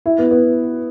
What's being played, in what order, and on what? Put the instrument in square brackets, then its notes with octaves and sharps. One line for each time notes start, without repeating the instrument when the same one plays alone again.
[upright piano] E4
B3
B3